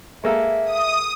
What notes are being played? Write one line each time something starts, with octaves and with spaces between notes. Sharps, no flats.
G#3 A#3 A4 E5
D#6